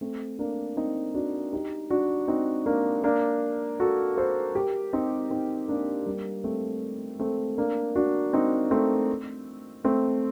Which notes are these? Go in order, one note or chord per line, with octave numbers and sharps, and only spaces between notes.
A3 C4
A#3 D4
C4 D#4
D4 F#4
D#4 G4
D4 F#4
C4 D#4
A#3 D4
A#3 D4
F#4 A4
A4 C5
G4 A#4
C4 D#4
C4 D#4
A#3 D4
G3 A#3
A3 C4
A3 C4
A#3 D4
D4 F#4
C4 D#4
A3 C4
A3 C4